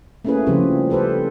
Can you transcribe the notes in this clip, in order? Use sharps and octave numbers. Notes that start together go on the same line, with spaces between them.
A3 A#3 C#4 E4 G#4 B4
C#3 F3 G3 C4 F4 G4
G4 A4 B4 C5